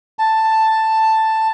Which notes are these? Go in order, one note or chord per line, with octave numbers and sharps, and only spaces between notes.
A5